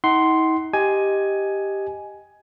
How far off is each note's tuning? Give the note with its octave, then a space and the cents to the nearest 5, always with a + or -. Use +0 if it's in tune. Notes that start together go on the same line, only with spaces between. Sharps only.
D#4 +45 F#5 +30 C6 +0
G4 +0 D#5 +0 G#5 +10